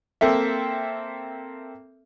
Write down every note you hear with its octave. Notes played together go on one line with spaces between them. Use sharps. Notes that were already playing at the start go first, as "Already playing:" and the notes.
A#3 C4 A4 E5